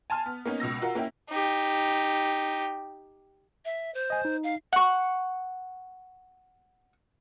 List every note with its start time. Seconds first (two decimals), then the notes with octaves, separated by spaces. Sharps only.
0.10 G#5 A5 C6 F6
0.26 B3
0.45 A#3 B3 C#4 D#4
0.60 C#2 B2 E6 A#6
0.82 F4 F#4 A#4 F#5
0.95 A#3 C#4 E4 G5
1.30 D#4 G4
3.65 E5
3.94 C5
4.10 D#5 G#5
4.25 D#4
4.44 F5
4.73 F#5 C#6